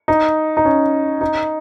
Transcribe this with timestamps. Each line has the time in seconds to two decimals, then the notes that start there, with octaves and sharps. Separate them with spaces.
0.08 D#4
0.57 D#4
0.65 C#4
1.21 D#4